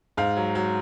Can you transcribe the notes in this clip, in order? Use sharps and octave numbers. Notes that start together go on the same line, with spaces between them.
G#2 F5
F#3
F#3